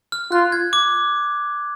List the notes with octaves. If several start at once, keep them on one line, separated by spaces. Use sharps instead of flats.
F6
F4 F#6
G#6
D6